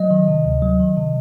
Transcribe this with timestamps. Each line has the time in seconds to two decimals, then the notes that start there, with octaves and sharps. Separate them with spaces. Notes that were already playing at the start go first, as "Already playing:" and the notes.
Already playing: F#3 D#5
0.11 D#3
0.28 C3
0.45 D2
0.62 F#3
0.80 D#3
0.97 C3